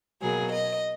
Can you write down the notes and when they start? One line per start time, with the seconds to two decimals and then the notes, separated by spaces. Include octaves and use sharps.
0.22 B2 F#3 A#3 G#4
0.51 D#5